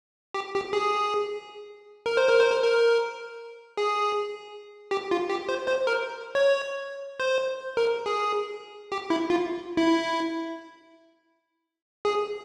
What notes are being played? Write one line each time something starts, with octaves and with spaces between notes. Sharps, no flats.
G4
G4
G#4
A#4
C5
A#4
C5
A#4
A#4
G#4
G4
F4
G4
C5
C5
A#4
C#5
C5
A#4
G#4
G4
E4
F4
E4
G#4